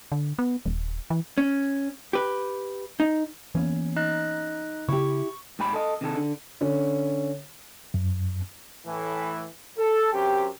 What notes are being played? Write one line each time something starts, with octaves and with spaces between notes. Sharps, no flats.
D3
B3
D#1
E3
C#4
G4 B4
D#4
E3 A#3 B3 C#4
D#4 D#5 F#6
C#3 E4 G4 C#6
G#2 G4 G#5 B5
A4 D#5
C3 D#3 G#4 A4
D3
D3 C#4
F#2
A2 E3
A4
F#2 C4 G4